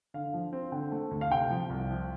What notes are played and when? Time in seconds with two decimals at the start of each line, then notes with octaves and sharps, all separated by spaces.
0.14 D3 F5
0.34 F3
0.53 C4
0.72 D3 G5
0.92 A3
1.11 D2
1.21 F5
1.31 C3 G5
1.50 F3
1.70 C2
1.90 F3